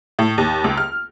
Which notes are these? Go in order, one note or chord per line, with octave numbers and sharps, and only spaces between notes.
A2
D#2
C#2
F6